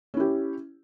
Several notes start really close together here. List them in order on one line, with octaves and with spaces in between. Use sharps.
C#4 E4 G4